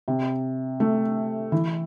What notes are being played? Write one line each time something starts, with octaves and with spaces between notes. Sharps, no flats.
C3
A3
E3